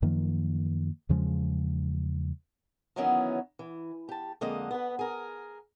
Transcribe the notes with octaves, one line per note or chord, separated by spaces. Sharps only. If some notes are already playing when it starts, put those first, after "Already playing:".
F#2 D#3 F3 A#3
E2 C#3 F3 G#3
D#3 E3 F#3 B3 C#4 D#4
E3
G4 A5
F2 D3 G#3 A#3 D#5 F#5
B3 B4
G#4 A#4